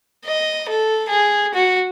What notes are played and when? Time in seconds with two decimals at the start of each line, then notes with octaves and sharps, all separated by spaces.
0.25 D#5
0.68 A4
1.09 G#4
1.54 F#4